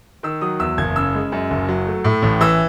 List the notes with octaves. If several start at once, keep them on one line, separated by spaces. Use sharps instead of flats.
D#3 E6
F#3 D#6
E2 E6
F#1 G#6
C#3 E6
G#3
F#2
F#1
F#3
A3
A2
A1
E3 E6